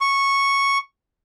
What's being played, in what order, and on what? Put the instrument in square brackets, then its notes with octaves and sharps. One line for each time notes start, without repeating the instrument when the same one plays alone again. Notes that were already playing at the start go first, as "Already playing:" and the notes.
[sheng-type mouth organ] C#6